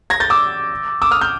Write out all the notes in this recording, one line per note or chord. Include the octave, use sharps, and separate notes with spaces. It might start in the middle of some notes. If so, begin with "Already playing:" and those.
G#6 A#6
G6 A6
D6 E6
D6 E6
D#6 F6
F6 G6